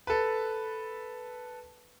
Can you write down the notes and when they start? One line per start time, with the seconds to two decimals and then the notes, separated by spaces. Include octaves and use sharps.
0.07 A4 B4